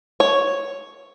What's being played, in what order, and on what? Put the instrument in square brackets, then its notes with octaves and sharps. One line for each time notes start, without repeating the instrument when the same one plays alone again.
[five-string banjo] C#5